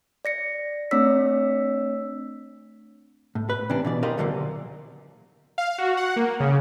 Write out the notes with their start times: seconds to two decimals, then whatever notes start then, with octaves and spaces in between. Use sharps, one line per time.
0.25 D5 A#6 C#7
0.91 A3 C4 D4 C#5 E6 B6
3.35 A2
3.50 B4
3.70 C3 E3 C#4 D4
3.85 B2 E3 D5
4.03 G4 A#4 C5 D5 D#5 F5
4.17 E2 A#2 D3 F#3 A3 A#3
5.58 F5
5.78 F#4
5.97 F#5
6.16 A#3
6.40 C#3